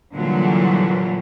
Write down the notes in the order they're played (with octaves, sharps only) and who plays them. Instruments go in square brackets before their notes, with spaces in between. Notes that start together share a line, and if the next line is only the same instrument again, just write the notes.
[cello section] A#2 D3 E3 F#3 G3